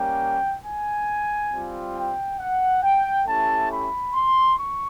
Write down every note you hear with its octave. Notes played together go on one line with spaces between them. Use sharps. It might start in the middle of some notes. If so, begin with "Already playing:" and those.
Already playing: G3 A#3 C#4 G5
G#5
G3 C4 F4
G5
F#5
G5
A3 C#4 E4 G4 A5
B5
C6
C#6